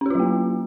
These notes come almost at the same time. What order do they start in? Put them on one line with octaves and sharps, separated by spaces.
C#4 G4 F4 F#3 A#3